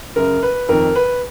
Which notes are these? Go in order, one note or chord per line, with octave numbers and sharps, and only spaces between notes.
F#2 C#3 A#4
B4
F2 D#3 A#4
B4